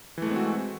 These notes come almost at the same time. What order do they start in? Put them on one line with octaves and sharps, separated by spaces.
E3 A3 G#3 C4 F#4